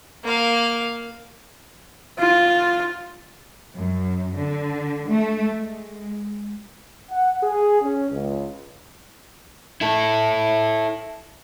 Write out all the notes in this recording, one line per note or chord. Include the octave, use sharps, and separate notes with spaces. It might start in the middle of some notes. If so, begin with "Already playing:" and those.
A#3 F5
F4
F#2
D3
A3
G#3
F#5
G#4
C#4
C#2
E4 A4